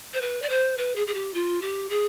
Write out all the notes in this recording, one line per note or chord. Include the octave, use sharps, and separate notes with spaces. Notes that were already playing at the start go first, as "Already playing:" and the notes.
C5
B4
D5
C5
B4
G#4
G#4
G4
F4
G4
G#4